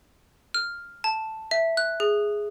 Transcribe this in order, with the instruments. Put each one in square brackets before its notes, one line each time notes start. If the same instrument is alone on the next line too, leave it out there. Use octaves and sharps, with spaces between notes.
[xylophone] F6
A5
E5
F#6
G#4